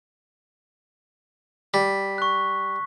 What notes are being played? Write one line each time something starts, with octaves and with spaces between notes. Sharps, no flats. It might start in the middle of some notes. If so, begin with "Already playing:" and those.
G3 B6
C#6 F#6